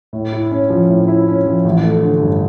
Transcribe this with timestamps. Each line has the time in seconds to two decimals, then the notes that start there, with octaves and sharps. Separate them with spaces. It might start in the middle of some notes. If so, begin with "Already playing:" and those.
0.13 A2
0.32 E4
0.51 C#4
0.70 F3
0.89 A2
1.08 E4
1.28 C#4
1.46 F3
1.65 A1
1.83 A3
2.03 D3
2.22 G2